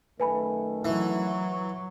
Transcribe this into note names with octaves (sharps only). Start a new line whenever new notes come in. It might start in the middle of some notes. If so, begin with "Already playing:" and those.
F#2 D#3 A3 B4 G#5 B5
E3 F#3